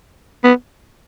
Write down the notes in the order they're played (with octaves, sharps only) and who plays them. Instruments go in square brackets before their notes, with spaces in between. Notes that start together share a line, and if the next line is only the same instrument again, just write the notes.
[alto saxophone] B3